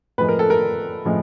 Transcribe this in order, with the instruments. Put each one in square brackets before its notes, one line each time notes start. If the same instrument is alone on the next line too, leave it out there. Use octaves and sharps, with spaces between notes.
[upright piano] A2 F3 G#3 B4
A#4
A4
A#4
A2 F3 G#3